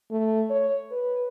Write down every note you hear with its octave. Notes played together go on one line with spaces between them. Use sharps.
A3
C#5
B4